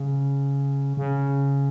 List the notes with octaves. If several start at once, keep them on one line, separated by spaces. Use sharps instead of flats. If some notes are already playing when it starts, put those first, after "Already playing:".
Already playing: C#3
C#3